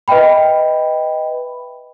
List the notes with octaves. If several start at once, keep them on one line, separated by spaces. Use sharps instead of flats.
B4 D#5 E5 G5 B5